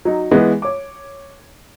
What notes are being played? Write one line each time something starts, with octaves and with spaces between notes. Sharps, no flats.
F#3 D#4
E3 G#3 B3
C#5 D6